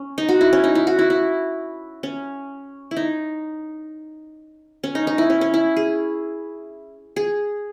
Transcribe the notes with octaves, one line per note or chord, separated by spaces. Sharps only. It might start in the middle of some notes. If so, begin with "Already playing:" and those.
Already playing: C#4
D#4
F#4
E4
C#4
D#4
E4
F#4
E4
E4
C#4
E4
D#4
C#4
D#4
D#4
E4
C#4
C#4
E4
G#4
G#4